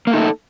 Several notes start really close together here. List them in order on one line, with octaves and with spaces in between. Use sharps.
A#3 A3 D#4 A4